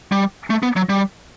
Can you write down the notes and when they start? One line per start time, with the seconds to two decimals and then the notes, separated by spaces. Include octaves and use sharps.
0.12 G3
0.50 A3
0.63 B3
0.76 F#3
0.89 G3